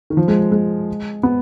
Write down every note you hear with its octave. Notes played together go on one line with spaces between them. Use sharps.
D#3
F3
G#3
G#3
B3